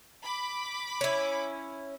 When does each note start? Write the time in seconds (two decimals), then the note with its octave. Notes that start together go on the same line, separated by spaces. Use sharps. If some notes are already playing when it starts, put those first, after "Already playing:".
0.21 B5 D6
1.01 C#4 E4